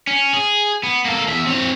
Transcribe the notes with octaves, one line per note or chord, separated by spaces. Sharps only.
C#4
G#4
B3
A#3 A4
E2 E5
C4 C#5